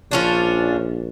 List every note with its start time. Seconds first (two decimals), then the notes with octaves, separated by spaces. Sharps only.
0.11 A#1 F3 C#4 D4